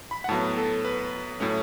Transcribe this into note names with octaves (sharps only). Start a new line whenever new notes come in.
B5
F#5
A2 F#3 B3 A5
A4
B4
A2 F#3 A3 C#4